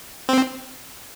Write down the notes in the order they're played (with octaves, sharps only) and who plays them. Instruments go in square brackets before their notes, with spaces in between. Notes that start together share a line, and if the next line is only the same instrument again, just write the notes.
[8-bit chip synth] C4